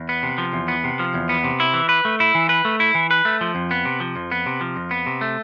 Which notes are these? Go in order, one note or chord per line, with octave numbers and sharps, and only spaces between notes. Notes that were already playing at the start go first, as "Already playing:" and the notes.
Already playing: E2
B3
C3
F3
E2
B3
C3
F3
E2
B3
C3
E4
E3
B4
A3
E4
E3
B4
A3
E4
E3
B4
A3
F3
F2
B3
C3
F3
F2
B3
C3
F3
F2
B3
C3
A3